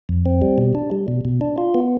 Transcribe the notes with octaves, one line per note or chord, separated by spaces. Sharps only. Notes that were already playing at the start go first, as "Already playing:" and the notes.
F2
C4
G3
B2
D4
G3
B2
B2
D4
F4
B3